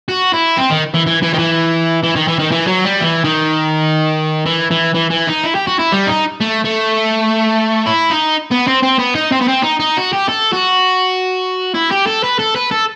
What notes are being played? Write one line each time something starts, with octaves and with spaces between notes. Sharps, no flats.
F#4
E4
C4
D#3
E3
E3
E3
D#3
E3
E3
D#3
E3
D#3
E3
F#3
G3
E3
D#3
E3
E3
E3
E3
D#4
E4
G4
F#4
E4
G3
D#4
A3
A3
E4
D#4
B3
C4
C4
B3
D#4
C4
B3
C4
D#4
D#4
F#4
G4
A4
F#4
E4
G4
A4
B4
A4
B4
A4